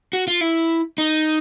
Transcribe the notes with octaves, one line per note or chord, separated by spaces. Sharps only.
F#4
F4
E4
D#4